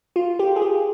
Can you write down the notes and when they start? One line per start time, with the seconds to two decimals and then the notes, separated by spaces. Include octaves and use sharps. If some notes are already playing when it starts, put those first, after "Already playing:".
0.16 F4
0.39 G4
0.56 G#4
0.62 G4